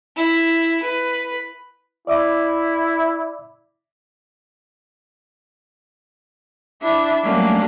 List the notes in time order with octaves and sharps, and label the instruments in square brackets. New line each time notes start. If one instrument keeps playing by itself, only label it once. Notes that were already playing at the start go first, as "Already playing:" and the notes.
[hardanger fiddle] E4
B4
[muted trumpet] E4 [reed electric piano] D5 E5 D6
[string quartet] D4 E4 E5
F#3 G3 A3 A#3 C#4 D4